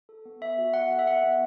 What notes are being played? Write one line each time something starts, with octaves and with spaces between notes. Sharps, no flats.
A4
B3
B3 E5
F#4
B3 F#5
A4
E5
B3 F#5
B3